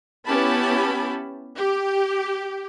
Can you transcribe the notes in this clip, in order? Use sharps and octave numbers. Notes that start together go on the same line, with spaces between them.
B3 C#4 E4 G4 A5 B5
G4